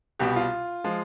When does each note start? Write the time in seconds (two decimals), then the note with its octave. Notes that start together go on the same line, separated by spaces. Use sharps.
0.19 C2 B2 G3 G4
0.36 F4
0.84 F3 G#3